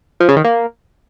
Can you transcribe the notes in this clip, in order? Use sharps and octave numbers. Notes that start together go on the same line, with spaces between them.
F3
C#3
D#3
A#3